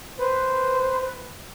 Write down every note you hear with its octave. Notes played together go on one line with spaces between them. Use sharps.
B4 C5